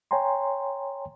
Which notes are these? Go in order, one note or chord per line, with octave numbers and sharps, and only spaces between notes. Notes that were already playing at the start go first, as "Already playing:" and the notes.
C#5 G5 G#5 A#5 C6